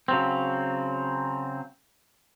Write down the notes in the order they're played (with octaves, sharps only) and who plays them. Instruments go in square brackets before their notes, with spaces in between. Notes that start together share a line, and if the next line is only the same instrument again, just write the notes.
[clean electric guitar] C#3 F#3 C4